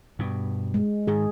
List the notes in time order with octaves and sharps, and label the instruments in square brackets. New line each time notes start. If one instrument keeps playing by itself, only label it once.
[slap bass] G2 B2
[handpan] G#3
[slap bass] G#2 D#3 [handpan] G#4